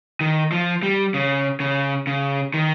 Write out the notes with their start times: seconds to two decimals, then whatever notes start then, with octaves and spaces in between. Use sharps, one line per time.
0.21 D#3
0.52 F3
0.83 G3
1.14 C#3
1.60 C#3
2.07 C#3
2.54 D#3